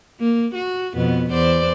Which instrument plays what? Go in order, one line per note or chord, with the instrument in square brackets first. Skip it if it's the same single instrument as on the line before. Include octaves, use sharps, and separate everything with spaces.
[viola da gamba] A#3
F#4
F2 B2 B3
E2 C5 D5